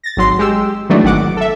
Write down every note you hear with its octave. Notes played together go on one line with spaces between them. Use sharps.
A6 A#6
G#1 F#3 C6
G#3 G4 E6
D#3 E3 F#3 G#3 A3 D4
G#1 D#3 F#5 D6
A4 E5